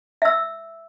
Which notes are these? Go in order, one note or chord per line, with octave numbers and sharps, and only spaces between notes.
E5 E6